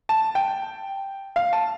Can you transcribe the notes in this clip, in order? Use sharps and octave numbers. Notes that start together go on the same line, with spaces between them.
A5
G5
F5
A5